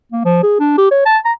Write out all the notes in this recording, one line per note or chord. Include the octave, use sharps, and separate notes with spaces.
A#3
F3
G#4
D4
G4
C#5
A5
A#5